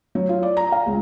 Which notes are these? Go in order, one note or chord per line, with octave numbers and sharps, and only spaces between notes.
F#3
F4
D5
A#5
F5
C#2